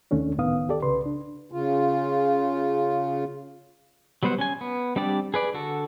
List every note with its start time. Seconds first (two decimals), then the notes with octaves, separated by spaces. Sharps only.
0.11 D#2 D#3 A3 C#4 D4
0.38 C#2 A2 D#3 B3 F5 D#6
0.69 G4 A4 D5
0.82 C2 C#3 B4 C6
1.06 D4
1.52 C#3 F4
4.23 F#3 G3 B3 C5 F#5
4.39 C#4 G#5
4.61 B3
4.96 G3 C4 D4 G4 D5
5.34 G#4 B4 D5
5.54 D3 F#4 A4